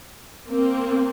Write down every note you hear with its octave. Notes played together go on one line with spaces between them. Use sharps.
A#3 C4